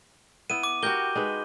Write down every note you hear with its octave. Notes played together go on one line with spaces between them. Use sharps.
B3 E4 D#7
D6
F#4 G4 A#4 G6 G7
G#3 D#4 B4